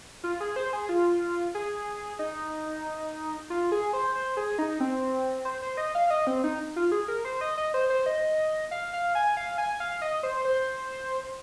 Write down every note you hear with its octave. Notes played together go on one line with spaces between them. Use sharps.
F4
G#4
C5
G#4
F4
G#4
D#4
F4
G#4
C5
C5
G#4
D#4
C4
C5
C5
D#5
F5
D#5
C4
D#4
F4
G#4
A#4
C5
D#5
D#5
C5
C5
D#5
F5
F5
G#5
F5
G#5
F5
D#5
C5
C5